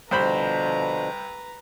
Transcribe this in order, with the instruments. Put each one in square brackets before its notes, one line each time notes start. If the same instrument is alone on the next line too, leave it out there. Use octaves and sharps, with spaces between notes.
[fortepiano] C2 C5 B5 [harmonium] B2 D3 F3 [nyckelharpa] B4 A#5